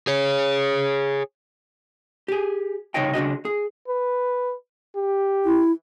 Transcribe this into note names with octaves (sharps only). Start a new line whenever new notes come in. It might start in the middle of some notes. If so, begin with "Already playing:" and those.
G#4 C#5
G4 G#4
C2 C#3 D#4 C#5 D#5 G5
C#3 D4 F#4 D#5
G#4
B4
G4
E4